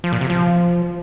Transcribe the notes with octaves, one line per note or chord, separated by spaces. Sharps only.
F3
A#2
C3
F3